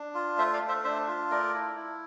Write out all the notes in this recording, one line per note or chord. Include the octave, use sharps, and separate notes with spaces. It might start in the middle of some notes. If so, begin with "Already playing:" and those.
Already playing: D4
F4
A3 C5 E5
D5 F5
A3
C5 E5
D4 C5 E5
F4
A3 A#4 D5
E4
E4